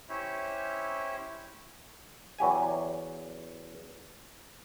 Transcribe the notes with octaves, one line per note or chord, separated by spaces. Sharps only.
C#4 E4 G4 C5 C#5 E5
E2 F#3 G4 G#5